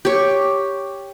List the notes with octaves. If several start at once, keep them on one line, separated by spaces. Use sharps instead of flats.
G4 C#5